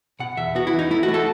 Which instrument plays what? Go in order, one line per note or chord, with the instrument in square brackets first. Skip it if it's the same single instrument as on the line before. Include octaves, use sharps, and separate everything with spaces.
[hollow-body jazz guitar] B2 F#5
E2 E5
B3 F#4
E4
E3
D#4
A3 E4
F#4
A3
A4